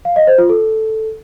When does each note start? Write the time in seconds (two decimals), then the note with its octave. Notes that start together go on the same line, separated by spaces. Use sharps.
0.05 F5
0.16 D#5
0.27 C5
0.38 F4
0.49 A4